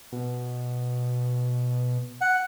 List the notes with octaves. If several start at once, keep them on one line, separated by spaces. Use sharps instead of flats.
B2
F#5